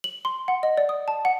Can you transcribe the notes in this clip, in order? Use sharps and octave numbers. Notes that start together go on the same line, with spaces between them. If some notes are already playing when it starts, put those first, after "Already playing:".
F#7
C6
F#5
D#5
D5
D#6
A5
F#5